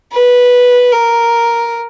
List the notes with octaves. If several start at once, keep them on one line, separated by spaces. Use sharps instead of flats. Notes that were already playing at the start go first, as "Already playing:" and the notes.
B4
A#4